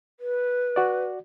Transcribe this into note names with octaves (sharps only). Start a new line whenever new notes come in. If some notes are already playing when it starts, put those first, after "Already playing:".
B4
F#4 D5